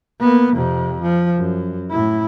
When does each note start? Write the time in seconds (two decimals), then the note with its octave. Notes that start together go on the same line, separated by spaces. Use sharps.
0.21 A#3 B3
0.54 F2 C3
1.02 F3
1.36 F#2
1.91 A2 E4